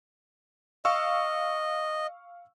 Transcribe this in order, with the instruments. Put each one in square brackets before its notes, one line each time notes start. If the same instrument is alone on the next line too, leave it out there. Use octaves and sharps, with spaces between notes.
[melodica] D#5 [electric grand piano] F5 C#6 E6